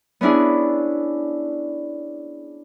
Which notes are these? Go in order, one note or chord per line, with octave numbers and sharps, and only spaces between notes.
B3 C#4 D4 E4 G#4